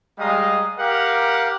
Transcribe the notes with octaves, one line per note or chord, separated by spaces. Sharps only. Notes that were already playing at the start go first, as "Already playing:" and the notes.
G3 G#3 D#5 F5 A#5 D#6
G4 A#4 F5 F#5 D6